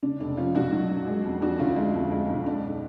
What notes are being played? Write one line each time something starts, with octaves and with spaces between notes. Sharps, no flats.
C#3 D4
F1 D4
F3 C#4 F4
B1 D4 F#4
F#3
F#2
G#3
F2
F3 D4 F#4
D2 C#4 F4
G#3
F2
G#3
B1
G#3 D4
D4